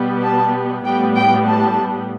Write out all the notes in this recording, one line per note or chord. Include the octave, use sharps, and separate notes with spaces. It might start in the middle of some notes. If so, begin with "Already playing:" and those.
Already playing: B2 G3 B3
A5
A2 G3 B3 G5
G5
A5